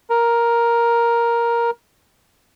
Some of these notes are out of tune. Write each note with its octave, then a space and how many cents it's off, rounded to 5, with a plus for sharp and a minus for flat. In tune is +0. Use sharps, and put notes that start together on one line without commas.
A#4 +5